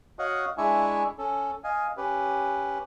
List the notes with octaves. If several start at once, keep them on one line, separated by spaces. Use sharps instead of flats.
F#4 C#5 D#5 F5 F#5 C#6
G#3 D4 E4 E5 G#5 C#6
C#4 A4
D#5 F5 G#5
C#4 G4 B4